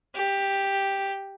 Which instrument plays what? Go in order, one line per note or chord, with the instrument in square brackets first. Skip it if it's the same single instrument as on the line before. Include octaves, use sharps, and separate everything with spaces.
[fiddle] G4